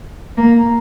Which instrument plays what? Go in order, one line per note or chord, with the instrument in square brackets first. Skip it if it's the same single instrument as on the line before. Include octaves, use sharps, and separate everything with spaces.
[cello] A#3